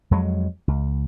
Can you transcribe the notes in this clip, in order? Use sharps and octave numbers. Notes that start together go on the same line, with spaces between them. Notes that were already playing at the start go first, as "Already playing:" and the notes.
F2 F#3 G#3
C#2